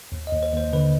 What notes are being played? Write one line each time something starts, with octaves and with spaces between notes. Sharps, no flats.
D#2
D#5
D#2
C5
D#2 C5
D3 B4